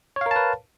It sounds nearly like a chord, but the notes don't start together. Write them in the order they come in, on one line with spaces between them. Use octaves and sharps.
C#5 F5 A#4 A5 B4